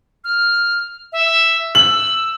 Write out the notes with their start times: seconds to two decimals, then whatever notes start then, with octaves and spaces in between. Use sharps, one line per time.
0.24 F6
1.12 E5
1.75 E6 F#7